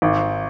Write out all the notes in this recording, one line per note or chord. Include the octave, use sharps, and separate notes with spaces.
G#1